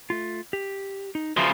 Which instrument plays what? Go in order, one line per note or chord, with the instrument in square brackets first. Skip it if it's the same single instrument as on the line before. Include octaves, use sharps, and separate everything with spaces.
[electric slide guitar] A3 F4
G4
D#4
[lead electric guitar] C#3 F3 [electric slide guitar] F#4 B4 E5